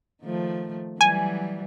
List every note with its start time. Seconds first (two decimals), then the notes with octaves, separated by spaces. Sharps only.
0.22 D#3 F3 A3
1.01 E3 F#3 G3 G#5